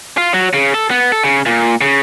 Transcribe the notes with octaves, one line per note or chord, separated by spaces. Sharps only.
F4
F#3
C#3
A4
B3
A4
C#3
A#2
C#3